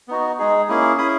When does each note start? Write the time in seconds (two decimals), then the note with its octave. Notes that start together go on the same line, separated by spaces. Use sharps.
0.08 B3 D#4 F#4
0.39 G#3 D#4 G#4
0.68 A#3 C#4 E4 G#4
0.98 C#4 E4 G#4 B5 D#6